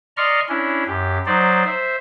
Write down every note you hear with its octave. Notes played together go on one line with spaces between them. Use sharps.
D5 D#5 A#5 C6 C#6 F6
C#4 D4 E4
F#2 G4
F#3 D#4 C5 D5
C5 E5